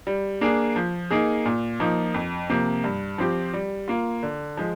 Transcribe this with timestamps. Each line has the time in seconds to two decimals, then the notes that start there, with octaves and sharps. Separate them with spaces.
0.07 G3
0.41 A#3 D4 G#4
0.76 F3
1.11 A#3 D#4 G#4
1.45 A#2
1.80 F3 A#3 D#4
2.14 F2
2.50 C3 F3 A#3
2.84 G2
3.18 F3 C4 G4
3.53 G3
3.88 A#3 F4
4.23 D3
4.57 F3 G#3